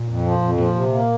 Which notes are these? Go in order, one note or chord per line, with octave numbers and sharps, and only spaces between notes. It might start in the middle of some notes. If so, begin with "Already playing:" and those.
Already playing: A#2
F2
F3
F2
A#2 F3
C3
A#3